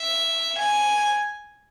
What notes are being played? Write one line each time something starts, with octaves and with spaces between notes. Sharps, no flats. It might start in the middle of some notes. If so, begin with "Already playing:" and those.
Already playing: E5
G#5